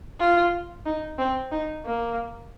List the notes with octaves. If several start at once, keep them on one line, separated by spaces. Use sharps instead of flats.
F4
D#4
C4
D#4
A#3